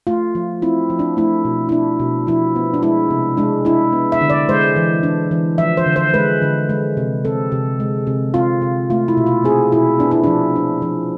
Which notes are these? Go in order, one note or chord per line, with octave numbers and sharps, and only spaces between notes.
A3 F4
F3
C4 E4
F3
D4
A3 E4
B2
E4
D4
B2
F3 E4
B3
D4
G#3 E4
C3
G#3 D4
D4 E4
B3
E5
D3
D5
G#3 C5
E3
D4
E3
F3 E5
C5
D3
C5
G#3 B4
D3
G#3
C3
C4 A4
C3
G#3
C3
C4 F4
C3
A3 F4
E4
B2
F4
C4 G#4
B2 E4
B3 D4
E4
F3 D4
D4
F3